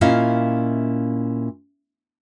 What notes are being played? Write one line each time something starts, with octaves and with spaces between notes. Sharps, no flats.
A#2 C#4 E4 D#5 F5